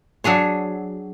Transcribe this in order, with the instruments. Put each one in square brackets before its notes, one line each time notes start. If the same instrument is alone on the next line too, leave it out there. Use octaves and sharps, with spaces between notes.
[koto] F#3 D4 G#4 C#5